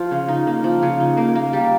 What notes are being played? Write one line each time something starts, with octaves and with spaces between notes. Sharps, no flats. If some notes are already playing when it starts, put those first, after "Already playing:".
Already playing: F3
C#3
D#4
A#3
F3
C#3
D#4
A#3
A#3
G3